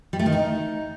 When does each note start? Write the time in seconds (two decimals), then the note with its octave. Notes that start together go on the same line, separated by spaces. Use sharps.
0.13 G3
0.19 A3
0.26 D#3
0.32 D#4